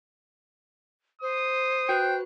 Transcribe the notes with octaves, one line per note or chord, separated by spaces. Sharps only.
C5 D#6
F#4 B4 G5 F#6